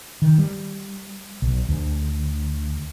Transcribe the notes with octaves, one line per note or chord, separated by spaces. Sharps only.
D#3
G3
B1
D2